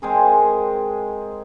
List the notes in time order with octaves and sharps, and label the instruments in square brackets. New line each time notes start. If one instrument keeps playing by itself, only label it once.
[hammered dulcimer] G#3 C4 G#4 A#4